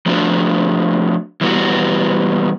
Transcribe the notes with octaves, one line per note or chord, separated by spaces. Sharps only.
F3 A3 D4 F#4
E3 G3 B3 D#4 F#4